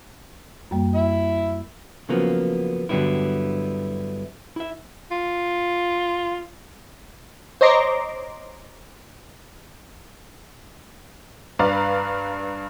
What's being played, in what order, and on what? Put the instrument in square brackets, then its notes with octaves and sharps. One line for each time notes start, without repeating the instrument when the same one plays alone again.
[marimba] F#2 G3 A#3
[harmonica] E4 E5
[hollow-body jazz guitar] C#3 F3 F#3 A#3 B3
G2 D3 F#3 G3 B3 E4
E4 E5
[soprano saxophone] F4
[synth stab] C5 C#5 D#5 A#5 C6 D6
[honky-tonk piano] G2 B4 D5 F5 A#5